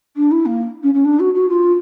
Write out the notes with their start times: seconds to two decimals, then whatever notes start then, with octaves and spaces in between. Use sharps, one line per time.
0.16 D4
0.31 E4
0.46 A#3
0.83 C#4
0.94 C#4
1.04 D4
1.19 F#4
1.34 F#4
1.49 F4